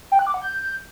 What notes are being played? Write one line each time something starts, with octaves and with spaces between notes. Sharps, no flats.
G5
F#6
D6
F#5
G6